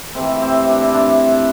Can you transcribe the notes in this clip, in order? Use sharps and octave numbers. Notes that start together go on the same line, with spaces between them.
C3 E3 A3 C4
C4
D4
E4
D4